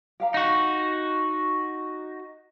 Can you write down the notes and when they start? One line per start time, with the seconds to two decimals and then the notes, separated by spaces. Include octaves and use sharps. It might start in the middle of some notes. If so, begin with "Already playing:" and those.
0.20 G4 F5 A#5
0.34 D#4 F#4